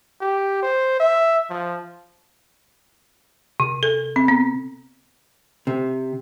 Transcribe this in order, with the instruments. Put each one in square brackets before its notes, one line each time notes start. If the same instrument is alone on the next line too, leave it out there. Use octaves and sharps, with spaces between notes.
[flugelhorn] G4
C5
E5
F3
[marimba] C3
A4
C4
B3
[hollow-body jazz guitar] C3